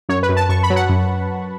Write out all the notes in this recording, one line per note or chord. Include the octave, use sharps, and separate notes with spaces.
F#2 C#5
B4
F#2
A5
F#2 C#6
B5
F#3
F#5
F#2